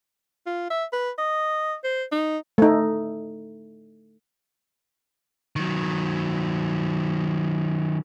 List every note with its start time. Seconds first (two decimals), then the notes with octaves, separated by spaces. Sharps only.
0.46 F4
0.70 E5
0.93 B4
1.18 D#5
1.84 C5
2.12 D#4
2.58 A3 D#4
5.56 D#3 F#3